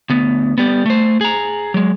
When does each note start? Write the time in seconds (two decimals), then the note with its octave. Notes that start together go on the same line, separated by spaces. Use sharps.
0.10 D2 B3
0.58 G3 B3
0.86 A3 C5
1.21 G#4 A#5
1.74 F#3 G#3